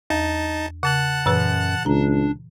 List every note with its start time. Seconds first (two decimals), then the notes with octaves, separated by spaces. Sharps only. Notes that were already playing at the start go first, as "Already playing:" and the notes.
0.10 E2 D#4 A5
0.83 C#3 F#5 A5 F#6
1.26 F#2 A#2 E3 B4
1.86 C#2 D4 A#5